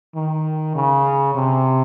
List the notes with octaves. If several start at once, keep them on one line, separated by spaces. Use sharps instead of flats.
D#3
C#3
C3